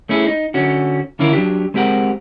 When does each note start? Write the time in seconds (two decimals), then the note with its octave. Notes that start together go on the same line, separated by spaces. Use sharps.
0.09 A3 C#4 E4 G#4
0.27 D#4
0.54 D3 C#4 F#4
1.19 D3 E3 C#4 E4 F4 A#4
1.33 F#3 D4 G4
1.74 G#3 C4 G4 A#4 F#5